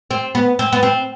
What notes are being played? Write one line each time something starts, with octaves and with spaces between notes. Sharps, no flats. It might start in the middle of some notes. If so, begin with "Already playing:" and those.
C4
B3
C4
B3
C4